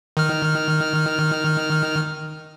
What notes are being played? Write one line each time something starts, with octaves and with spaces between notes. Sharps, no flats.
D#3 F6